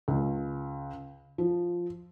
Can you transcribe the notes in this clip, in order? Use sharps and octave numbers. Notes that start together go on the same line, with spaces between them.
C#2
F3